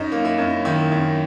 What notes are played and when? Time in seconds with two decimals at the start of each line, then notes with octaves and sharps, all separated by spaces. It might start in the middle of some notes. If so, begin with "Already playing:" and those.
Already playing: F#2 D#4
0.12 A#3
0.25 E4
0.38 F#2
0.65 D#3 E4
0.92 F#2